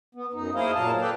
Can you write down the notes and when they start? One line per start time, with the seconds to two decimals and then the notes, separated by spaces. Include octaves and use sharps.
0.15 B3
0.33 F#2 D#4
0.55 A#3 E4 G#4 C5 D#5 F5
0.75 A#2 F#3 F5 A5
1.01 A4 B4 D5 G5